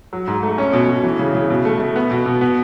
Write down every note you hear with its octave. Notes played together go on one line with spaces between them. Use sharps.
F#3
G#2
A3
C#4
B2
B2
E3
C#3
C#3
B2
A3
A3
B3
B2
B2
B3